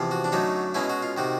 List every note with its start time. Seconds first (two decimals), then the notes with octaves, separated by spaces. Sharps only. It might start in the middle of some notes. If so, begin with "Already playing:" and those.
Already playing: E2 C3 F3
0.11 F#4
0.24 D4
0.32 F#2 D3 F#3 A3 D#4
0.74 B2 G#3 C#4 E4
0.90 F#4
1.02 F4
1.17 C3 D#3 F#4